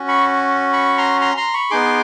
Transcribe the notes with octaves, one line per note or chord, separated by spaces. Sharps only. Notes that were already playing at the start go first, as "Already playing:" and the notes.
Already playing: C#4 F#4
B5 C#6
B5 C#6
A#5 C6
A#5 C6
A#5 C6
B5 C#6
B3 D#4 G#4 C6 D6